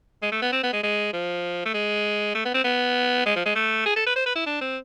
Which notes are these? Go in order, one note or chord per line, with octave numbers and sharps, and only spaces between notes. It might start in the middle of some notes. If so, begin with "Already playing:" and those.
G#3
A3
B3
C4
B3
G#3
G#3
F3
A3
G#3
A3
B3
C4
B3
G#3
F3
G#3
A3
G#4
A4
B4
C5
B4
E4
D4
C4